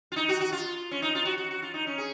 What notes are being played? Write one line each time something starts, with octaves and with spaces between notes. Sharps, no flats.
F4
D#4
F#4
F#4
F4
C#4
D#4
F4
F#4
F#4
F#4
F4
D#4
C#4
G#4